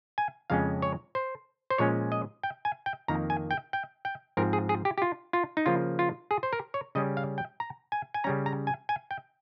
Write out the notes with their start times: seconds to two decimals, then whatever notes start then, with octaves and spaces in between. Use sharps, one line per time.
0.18 G#5
0.50 F2 C#3 G#3 C#4 F5
0.82 C#5
1.15 C5
1.70 C5
1.78 A#2 F3 G#3 C#4 C#5
2.12 D#5
2.43 G5
2.65 G#5
2.86 G5
3.08 F2 D#3 A#3 A#5
3.30 G#5
3.51 G5
3.73 G5
4.05 G5
4.37 G#2 F3 C4 A#4
4.53 G#4
4.69 G#4
4.85 G4
4.98 G4
5.02 F4
5.33 F4
5.57 D#4
5.66 C#3 F3 A#3 F4
5.99 F4
6.31 G#4
6.43 C5
6.53 A#4
6.74 C#5
6.95 C#3 G3 C#4 D#5
7.17 F5
7.38 G5
7.60 A#5
7.92 G#5
8.14 G#5
8.24 C#3 G3 C#4 A#5
8.46 A#5
8.67 G#5
8.89 G#5
9.11 G5